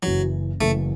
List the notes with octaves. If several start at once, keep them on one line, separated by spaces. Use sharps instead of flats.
F#1 F#2 E3 F#3
F#1 F#2 E3 A3